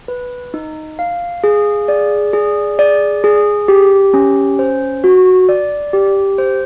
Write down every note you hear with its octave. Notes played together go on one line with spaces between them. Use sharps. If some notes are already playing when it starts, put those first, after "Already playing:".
B4
D#4
F5
G#4
D5
G#4
D5
G#4
G4
C#4
C5
F#4
D5
G4
C5